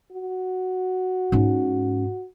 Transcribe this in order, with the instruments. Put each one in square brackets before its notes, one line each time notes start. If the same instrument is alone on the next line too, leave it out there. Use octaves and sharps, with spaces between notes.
[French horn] F#4
[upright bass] G#2 C#4